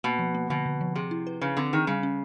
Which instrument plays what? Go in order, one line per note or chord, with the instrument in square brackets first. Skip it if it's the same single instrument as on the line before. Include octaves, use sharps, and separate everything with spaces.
[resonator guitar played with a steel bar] B2 [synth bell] A#3
[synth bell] F3
A#3
[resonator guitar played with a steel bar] B2 [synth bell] D3
[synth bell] D3
F3
[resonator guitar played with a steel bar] C3 [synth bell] G#4
[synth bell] E4
B4
[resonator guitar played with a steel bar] C#3 [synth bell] B4
[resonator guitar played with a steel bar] D3 [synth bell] C4
[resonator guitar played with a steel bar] D#3 [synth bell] G#4
[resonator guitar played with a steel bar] C#3 [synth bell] G3
[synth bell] C#4